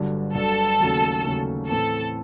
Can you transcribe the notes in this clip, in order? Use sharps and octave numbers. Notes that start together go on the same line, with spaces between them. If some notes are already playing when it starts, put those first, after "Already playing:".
Already playing: G1 G2 D3 F#3
G1 G2 D3 F#3 A4
D#2 C#3 F#3 A3 C#4
D#2 C#3 F#3 A3 C#4
A2 E3 A3 C4 A4